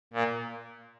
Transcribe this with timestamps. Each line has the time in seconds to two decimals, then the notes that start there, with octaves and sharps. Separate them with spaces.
0.13 A#2